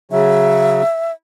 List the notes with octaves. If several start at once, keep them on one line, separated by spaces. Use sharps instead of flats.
C#3 F#3 E5